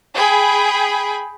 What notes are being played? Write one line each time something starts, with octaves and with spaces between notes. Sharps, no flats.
G#4 G5 B5